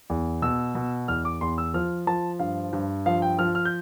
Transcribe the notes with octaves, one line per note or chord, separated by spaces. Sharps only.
E2
B2 E6
B2
E2 F6
D6
E2 C6
E6
F3 F6
F3 A5
G2 F5
G2
F3 F5
G5
F3 F6
F6
G6